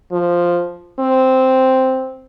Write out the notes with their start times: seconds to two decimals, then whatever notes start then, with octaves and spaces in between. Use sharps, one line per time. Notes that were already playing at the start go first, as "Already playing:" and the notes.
0.12 F3
1.00 C4